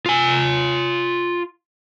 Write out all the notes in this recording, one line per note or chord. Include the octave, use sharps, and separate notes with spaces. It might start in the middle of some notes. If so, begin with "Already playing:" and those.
F4 G#5